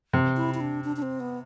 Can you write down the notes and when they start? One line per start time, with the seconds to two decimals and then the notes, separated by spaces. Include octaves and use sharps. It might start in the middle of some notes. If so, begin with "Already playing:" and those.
0.13 C3
0.37 E4
0.54 E4
0.60 D4
0.84 D4
0.96 D4
1.02 C4
1.20 B3